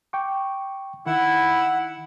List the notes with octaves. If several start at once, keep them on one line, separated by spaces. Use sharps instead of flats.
G5 C#6 D6
D#3 E4 F#5